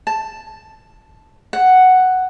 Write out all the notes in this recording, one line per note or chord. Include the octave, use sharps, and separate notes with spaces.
A5
F#5